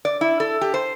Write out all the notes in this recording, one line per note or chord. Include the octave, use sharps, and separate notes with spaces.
D5
E4
A4
G4
C5